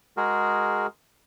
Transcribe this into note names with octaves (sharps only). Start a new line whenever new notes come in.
G#3 F#4 G#4 A#4